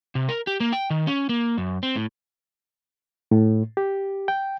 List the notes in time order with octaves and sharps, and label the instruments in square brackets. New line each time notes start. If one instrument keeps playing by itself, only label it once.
[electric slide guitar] C3
A#4
G4
A#3
G5
D#3
C#4
A#3
F#2
C4
A2
[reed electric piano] A2
G4
G5